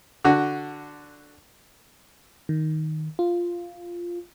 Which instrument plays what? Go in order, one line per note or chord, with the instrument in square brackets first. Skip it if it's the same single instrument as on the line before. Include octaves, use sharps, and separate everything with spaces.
[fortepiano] D3 F#4
[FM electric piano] D#3
F4